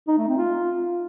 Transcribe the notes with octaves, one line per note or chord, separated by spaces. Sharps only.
D#4
A3
C4
F4